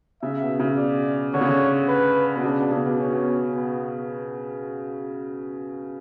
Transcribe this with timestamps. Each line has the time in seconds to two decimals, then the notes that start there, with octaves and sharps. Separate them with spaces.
0.22 C#3 E5
0.41 B2
0.60 C#3
0.77 D5
1.34 D3 C#5
1.41 C#3
1.49 D3
1.88 B4
2.35 B2
2.44 C#3 D4
2.58 B2
2.71 C#3
2.85 B2
2.99 C#4
3.12 B2
3.55 B3